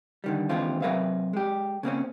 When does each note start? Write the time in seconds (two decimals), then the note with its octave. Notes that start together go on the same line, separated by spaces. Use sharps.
0.24 D3 D#3 G3
0.49 D#2 D3 E3 G#3 C4 F4
0.82 C3 F#3 A#4 B4 E5 F5
1.33 G#3 G4
1.83 C#3 A#3 C4 C#4